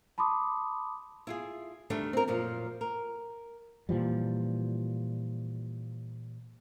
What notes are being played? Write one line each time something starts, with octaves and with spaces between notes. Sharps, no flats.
A5 B5 C6 D6 D#6
E4 F4 G#4
D2 D#3 G3 A3 D4
C4 A#4
F#2 A#2 F3
A#4
A#2 E3 F3 G3